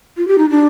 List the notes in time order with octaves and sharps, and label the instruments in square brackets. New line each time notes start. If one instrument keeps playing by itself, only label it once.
[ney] F4
G4
D#4
D4